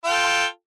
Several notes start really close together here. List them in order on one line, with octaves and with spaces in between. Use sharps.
F4 G5 A4